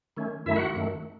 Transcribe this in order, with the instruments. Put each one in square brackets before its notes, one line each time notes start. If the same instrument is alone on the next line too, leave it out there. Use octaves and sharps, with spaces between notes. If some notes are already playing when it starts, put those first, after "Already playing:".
[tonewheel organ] D#3 A3 C#4
F#2 D#3 A3 E4 E5
F#4 F#5
F#2 D#3 A3